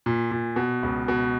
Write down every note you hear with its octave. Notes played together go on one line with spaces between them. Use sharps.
A#2
A#2
B2
C#2
B2